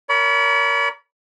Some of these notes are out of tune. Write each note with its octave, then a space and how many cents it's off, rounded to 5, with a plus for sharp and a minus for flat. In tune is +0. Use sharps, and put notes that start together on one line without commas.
A#4 +0 C#5 +45 B5 -20